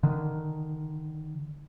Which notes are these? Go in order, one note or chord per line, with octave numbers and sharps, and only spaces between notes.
D3 D#3